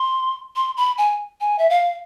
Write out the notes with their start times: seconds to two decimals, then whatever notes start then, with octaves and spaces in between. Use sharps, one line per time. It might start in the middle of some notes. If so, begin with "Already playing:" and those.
Already playing: C6
0.56 C6
0.77 B5
0.98 G#5
1.41 G#5
1.59 E5
1.70 F5